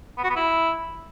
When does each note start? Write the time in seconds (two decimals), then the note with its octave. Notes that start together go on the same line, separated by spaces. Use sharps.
0.18 B3
0.24 F#4
0.30 B3
0.36 E4